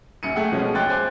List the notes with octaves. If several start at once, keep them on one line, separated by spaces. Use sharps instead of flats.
A#1 F#2 C#7 D#7
A3 G#4 F#5 G5
B2 F3 G#3 C#4
G5 C6 D6 F#6 A6
C5 G#5 C6 D6